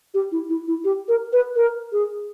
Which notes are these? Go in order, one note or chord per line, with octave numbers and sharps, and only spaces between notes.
G4
E4
E4
E4
G4
A#4
B4
A#4
G#4